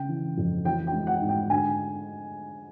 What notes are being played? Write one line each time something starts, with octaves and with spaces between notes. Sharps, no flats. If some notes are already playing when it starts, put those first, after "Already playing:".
Already playing: C#3 G5
E3
F2
E3 G5
G5
G#3
F#5
G#2
G5
D3 G#5